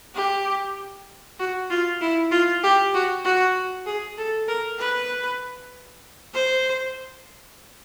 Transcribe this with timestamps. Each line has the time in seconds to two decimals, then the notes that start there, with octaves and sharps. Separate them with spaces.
0.15 G4
1.39 F#4
1.70 F4
2.01 E4
2.31 F4
2.63 G4
2.94 F#4
3.25 F#4
3.86 G#4
4.18 A4
4.48 A#4
4.79 B4
6.34 C5